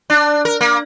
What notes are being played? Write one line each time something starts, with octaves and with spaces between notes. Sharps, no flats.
D4
A#4
A#3